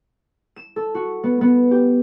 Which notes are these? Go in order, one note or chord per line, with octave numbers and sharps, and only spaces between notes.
E7
A4
F#4
B3
B3
G4